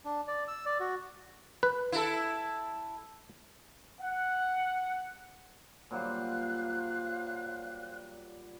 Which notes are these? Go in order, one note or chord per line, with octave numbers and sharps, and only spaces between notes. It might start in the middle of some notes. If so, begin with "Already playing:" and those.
D4
D5
E6
D5
F#4
B4
E4 A4
F#5
A#2 F#3 G3 C5 F5 F#6